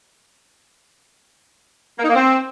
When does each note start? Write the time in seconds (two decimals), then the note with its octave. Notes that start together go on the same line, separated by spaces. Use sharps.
1.98 A#3
2.04 D#4
2.09 A#3
2.15 C4